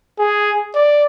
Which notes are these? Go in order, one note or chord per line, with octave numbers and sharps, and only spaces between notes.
G#4
D5